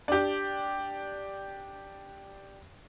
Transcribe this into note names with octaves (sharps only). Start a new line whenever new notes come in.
D4 G4